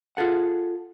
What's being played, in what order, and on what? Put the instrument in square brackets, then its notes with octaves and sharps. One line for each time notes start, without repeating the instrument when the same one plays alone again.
[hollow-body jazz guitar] F4 G#4 A4 F#5